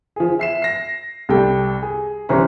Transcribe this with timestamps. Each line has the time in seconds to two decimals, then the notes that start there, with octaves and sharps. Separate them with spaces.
0.16 F3 G#4
0.39 E5 C7 E7
0.62 A#6 C7
1.29 C2 G3 A4 G5
1.82 G#4
2.29 C2 E3 C4 C#4 A#5